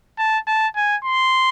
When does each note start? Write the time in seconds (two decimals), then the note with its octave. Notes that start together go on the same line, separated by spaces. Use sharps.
0.18 A5
0.47 A5
0.76 G#5
1.05 C6